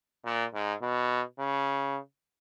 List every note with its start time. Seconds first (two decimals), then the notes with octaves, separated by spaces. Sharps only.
0.25 A#2
0.54 G#2
0.82 B2
1.39 C#3